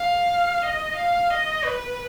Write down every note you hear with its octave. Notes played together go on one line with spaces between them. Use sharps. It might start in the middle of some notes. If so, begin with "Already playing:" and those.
Already playing: F5
D#5
F5
D#5
B4